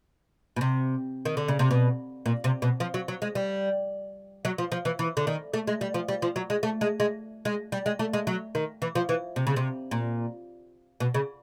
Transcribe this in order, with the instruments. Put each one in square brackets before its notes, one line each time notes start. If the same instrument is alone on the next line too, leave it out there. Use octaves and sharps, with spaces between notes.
[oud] B2
C3
D#3
D3
C#3
C3
B2
A#2
C3
B2
F3
F#3
F#3
G#3
G3
F#3
F3
F3
E3
E3
D3
D#3
A3
G#3
G3
F3
G3
F3
F#3
G#3
A3
G#3
G#3
G#3
G3
G#3
A3
G#3
F#3
D#3
E3
F3
E3
C3
C#3
C3
A#2
B2
C#3